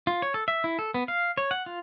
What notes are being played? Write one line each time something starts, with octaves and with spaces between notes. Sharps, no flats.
F4
C#5
A4
E5
E4
A4
B3
F5
C#5
F#5
F4